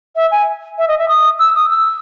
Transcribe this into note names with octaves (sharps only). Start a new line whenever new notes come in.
E5
G#5
E5
D#5
E5
D#6
E6
D#6
E6